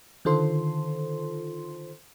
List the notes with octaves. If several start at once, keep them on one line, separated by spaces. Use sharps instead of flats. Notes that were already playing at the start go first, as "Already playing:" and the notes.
D3 D#3 F4 A4 C5 C6